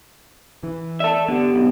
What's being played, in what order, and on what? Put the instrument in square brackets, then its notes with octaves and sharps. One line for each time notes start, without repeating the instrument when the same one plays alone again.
[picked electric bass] E3
[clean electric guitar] A4 E5 [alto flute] D5
[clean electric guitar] D3 [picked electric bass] B3 [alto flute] G4
[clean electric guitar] B1